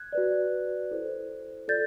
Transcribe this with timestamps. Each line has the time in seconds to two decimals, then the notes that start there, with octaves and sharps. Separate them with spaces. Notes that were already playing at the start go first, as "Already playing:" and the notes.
Already playing: F#6 G#6
0.13 F#4 B4 D5
0.91 E4 A4 C5
1.68 F4 A4 D5 G6 A6